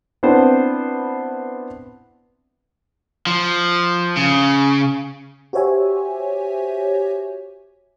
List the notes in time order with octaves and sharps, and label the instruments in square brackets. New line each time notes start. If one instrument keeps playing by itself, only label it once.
[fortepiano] B3 C4 D4 E4 B4 C5
[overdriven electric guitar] F3
C#3
[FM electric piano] F#4 G4 C5 C#5 E5 G#5